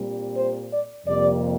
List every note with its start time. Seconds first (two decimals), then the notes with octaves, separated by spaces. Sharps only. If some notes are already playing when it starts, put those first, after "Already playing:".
Already playing: A#2 G3 C4
0.35 C5
0.71 D5
1.06 F2 C3 G3 A#3 D5